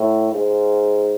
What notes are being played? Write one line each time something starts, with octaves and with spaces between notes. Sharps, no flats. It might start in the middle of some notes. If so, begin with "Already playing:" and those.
Already playing: A2
G#2